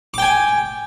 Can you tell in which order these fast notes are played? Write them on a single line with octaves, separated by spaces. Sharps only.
D6 G5 G#5